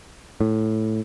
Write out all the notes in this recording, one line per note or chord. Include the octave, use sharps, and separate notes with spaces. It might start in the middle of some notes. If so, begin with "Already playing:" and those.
A2